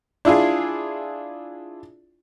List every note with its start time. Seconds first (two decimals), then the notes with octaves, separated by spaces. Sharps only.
0.25 D4 E4 F4 G#4